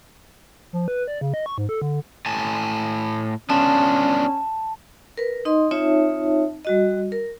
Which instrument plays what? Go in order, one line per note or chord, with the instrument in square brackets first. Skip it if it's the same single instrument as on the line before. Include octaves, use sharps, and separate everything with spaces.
[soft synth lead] F3
B4
D5
C#3
D#5
C#6
G#2
A4
D3
[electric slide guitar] A2 G#5 A5
[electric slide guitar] B3 D4 F4 [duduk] C#4 [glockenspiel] A5
[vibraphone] A#4 B4
D#4 D#5 C6
C4 D#4 F4 C#5 E5 A5
G3 F#4 D#5
A#4